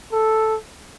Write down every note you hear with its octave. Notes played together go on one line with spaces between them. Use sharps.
A4